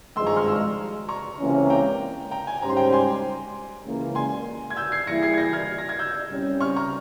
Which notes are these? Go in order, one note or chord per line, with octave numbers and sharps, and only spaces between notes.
G#1 G2 F3 G#3 C6 E6
A#5 C#6
C#6 F6
C6 E6
A#5 C#6
C#2 C3 E3 A#3 C#4
G5 A#5
G5 A#5
G#5
G#2 G3 C#4 G4 C5 A#5
C6
G5 A#5
G#5 C6
C#2 C#3 E3 A#3
G#5 C6
G#6
E6 G6
G#6 C7
E3 G3 A#3 E4 G#4 A#6 C#7
G#6 C7
G#6
G6 A#6
F6 G#6
A#6
G#6
E6 G6
C2 C3 G3 C#4
C#6 F6
A#5 C#6